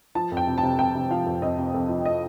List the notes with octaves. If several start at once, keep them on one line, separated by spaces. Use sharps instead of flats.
F3 A5
F2
G5
C3
A5
C3
C3 G5
C3
F3 F5
F2
F2 D#5
C3
F2
F3
D#5